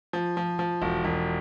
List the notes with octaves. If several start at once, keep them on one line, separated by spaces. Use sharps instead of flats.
F3
F3
F3
E1
E1